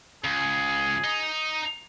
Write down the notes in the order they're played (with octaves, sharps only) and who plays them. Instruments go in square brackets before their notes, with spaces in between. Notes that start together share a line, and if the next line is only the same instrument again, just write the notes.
[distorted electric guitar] C#2 [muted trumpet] G#4
[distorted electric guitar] D#4